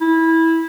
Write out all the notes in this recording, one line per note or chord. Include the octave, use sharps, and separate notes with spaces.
E4